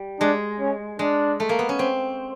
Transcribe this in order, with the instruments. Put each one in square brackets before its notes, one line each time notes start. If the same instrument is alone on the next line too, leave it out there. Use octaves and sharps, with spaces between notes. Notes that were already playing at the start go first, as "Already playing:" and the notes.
Already playing: [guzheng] G3
[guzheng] G#3 [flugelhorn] D4
[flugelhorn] C#4
[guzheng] G#3 [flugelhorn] D4
[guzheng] A3
A#3
B3
C#4
C4